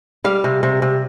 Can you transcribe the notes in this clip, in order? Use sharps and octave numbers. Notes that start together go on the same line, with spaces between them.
G3 F5
C3
C3
C3